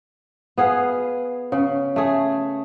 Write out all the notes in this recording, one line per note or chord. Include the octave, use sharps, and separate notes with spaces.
B3 G#4 F5
C#3
A3 G#4